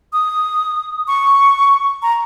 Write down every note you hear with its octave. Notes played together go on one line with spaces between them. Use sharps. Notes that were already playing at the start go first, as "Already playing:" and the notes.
D#6
C#6
A#5